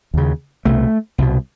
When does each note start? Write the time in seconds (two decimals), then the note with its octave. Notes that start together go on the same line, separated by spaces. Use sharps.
0.14 D#2 C#3
0.65 C2 B2 A3
1.18 C2 B2